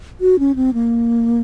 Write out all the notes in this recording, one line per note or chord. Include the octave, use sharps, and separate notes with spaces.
F#4
C#4
C4
A#3